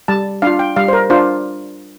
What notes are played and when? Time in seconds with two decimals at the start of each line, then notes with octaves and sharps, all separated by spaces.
0.08 G3 A5
0.42 D4 F4 F5
0.59 G5
0.76 G3 F5
0.88 C5
0.93 A#4
1.10 D4 F4 C5